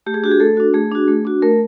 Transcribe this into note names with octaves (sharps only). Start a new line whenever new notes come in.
A3 G4
G#4
D4 F#4 G4
G#4
A3 A4
D4 F#4
A3 G#4
D4 F#4
A3
D4 F#4
A3 A#4